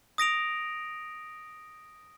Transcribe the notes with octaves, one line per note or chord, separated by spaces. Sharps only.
D#6 A#6 D7 F7